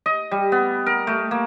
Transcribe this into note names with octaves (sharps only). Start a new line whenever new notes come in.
D#5
G3
B3
A#4
A3
A#3